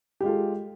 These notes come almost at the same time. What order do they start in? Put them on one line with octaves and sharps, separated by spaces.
G4 G#3 F4 A4